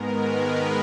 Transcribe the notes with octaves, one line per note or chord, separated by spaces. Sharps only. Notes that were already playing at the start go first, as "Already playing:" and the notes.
Already playing: G#2 D#3 G#3 B3 A#4
B4